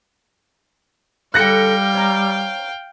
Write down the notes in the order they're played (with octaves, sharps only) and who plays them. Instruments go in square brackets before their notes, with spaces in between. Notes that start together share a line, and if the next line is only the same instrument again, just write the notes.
[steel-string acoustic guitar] D3 A4 [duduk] G3 [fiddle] F5 G5 [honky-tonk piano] F#6 A#6 C#7
[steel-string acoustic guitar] C#5 A#5